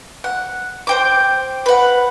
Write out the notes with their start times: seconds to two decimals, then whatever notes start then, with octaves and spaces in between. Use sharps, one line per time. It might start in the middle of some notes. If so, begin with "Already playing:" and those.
0.24 F#5
0.87 C5 G5 D6
1.66 B4 F#5